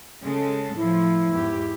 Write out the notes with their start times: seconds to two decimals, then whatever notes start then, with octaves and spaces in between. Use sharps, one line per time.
0.22 C#3 G#3 A4
0.76 A2 F3 E4
1.32 E2 G#2 G4